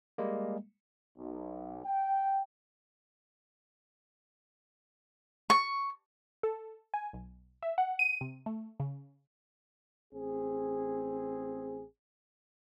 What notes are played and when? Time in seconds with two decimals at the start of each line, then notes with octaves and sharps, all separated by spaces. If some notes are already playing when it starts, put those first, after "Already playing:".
0.18 G3 G#3 A#3
1.18 B1
1.85 G5
5.50 C#6
6.43 A4
6.94 G#5
7.13 B1
7.63 E5
7.78 F#5
7.99 D#7
8.21 C3
8.46 A3
8.80 C#3
10.14 A1 C4 G#4